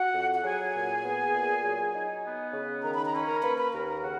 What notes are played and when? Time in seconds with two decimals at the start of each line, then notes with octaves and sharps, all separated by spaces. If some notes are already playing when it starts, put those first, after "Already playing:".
Already playing: F#4 F#5
0.14 F2
0.34 F#5
0.44 F#3 G#4 G#5
0.75 A#2
1.03 B3
1.33 A#2
1.64 F#3
1.94 D#4
2.24 B3
2.53 C#3
2.83 D#3 A#5
2.94 B5
3.05 A#5
3.13 C#4 B5
3.27 A#4 A#5
3.43 A#3 B4 B5
3.58 B4 B5
3.72 D#2 A#4 A#5
3.87 A#4 A#5
4.02 C#3 F#4 F#5